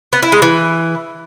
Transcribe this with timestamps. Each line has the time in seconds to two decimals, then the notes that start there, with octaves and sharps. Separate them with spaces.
0.13 B3
0.22 E4
0.32 G#3
0.42 E3